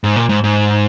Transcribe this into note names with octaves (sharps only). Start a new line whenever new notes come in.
G#2
A#2
G#2
G#2